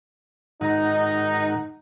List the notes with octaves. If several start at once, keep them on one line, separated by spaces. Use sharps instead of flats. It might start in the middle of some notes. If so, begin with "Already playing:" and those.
G#2 D#3 D#4 F#5